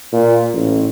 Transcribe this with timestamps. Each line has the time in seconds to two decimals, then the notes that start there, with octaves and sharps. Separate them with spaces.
0.12 A#2
0.53 A1